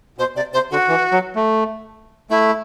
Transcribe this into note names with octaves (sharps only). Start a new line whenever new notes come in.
B2 C5
C3 D5
C3 C5
D3 F#4
E3
F#3
A3
A3 E4